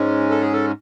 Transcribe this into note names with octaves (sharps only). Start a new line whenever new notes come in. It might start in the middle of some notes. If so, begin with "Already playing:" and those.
Already playing: G#2 G#3 C#4
A4
G#4
A4